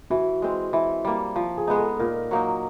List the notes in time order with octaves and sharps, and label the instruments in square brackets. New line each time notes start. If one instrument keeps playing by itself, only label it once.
[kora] E3 [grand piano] F#4
[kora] G#3 C4
E3
G3 A#3
F3
[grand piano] G#4
[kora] G#3 B3 D#4
[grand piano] A4
[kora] A#2 [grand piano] A#4
[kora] F#3 A#3 D#4